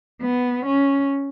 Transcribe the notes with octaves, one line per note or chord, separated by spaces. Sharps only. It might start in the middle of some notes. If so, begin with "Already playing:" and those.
B3
C#4